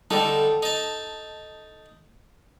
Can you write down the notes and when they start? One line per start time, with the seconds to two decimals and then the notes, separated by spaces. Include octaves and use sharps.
0.11 D3 G3 D#4 A4
0.63 D#4 A5